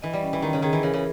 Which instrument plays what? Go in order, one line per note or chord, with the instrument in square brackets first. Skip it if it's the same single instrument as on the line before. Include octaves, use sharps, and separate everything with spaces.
[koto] E3 [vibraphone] D#5
[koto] G3
[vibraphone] C#4
[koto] E3
[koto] D#3 [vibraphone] D#5
[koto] C#3
[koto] D#3 [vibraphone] G#4
[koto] E3
[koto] C#3 [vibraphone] A#4
[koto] C#3